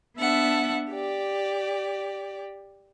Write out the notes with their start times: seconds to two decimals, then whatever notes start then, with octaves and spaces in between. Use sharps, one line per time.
0.17 B3 D4 E5 F#5 A5
0.89 G4 D5